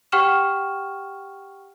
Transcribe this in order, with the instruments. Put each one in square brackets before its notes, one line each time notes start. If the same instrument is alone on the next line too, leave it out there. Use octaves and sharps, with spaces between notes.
[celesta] G4 F#5 G5 C#6 F6 E7